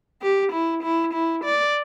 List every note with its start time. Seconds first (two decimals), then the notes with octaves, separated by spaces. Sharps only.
0.22 G4
0.53 E4
0.83 E4
1.14 E4
1.44 D5